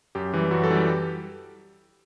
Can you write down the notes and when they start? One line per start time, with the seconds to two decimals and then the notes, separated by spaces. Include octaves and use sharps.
0.15 F#2 G4
0.34 E3 G3
0.51 F#2 F#4
0.64 A4
0.70 E3 G3
0.76 G4